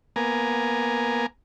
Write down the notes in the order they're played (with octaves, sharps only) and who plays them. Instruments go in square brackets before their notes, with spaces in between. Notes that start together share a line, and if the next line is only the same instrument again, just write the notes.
[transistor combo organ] A#3 B3 G#5 A#5